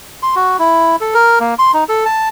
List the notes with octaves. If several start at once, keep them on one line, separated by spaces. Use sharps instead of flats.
C6
F#4
E4
A4
A#4
A#3
C6
D#4
A4
A5